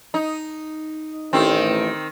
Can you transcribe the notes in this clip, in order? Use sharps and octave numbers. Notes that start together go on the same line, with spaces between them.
D#4
A1 D#3 C4